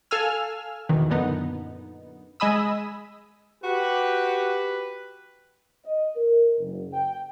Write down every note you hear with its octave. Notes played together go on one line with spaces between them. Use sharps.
A4 F5 G#5 E6 F6
E2 B2 D#3 E3
F#2 A#2 D3 B3 D#4
G#3 D#5 G#5 B5 D#6 E6
F#4 G4 B4
D#5
A#4
F#1
G5